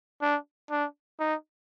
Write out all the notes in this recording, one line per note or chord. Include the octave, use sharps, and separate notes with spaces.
D4
D4
D#4